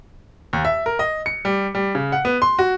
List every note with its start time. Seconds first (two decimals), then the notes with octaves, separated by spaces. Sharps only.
0.53 D#2
0.65 E5
0.86 A#4
0.99 D#5
1.26 C#7
1.45 G3
1.75 G3
1.95 C#3
2.12 F#5
2.25 B3
2.42 C6
2.59 F#4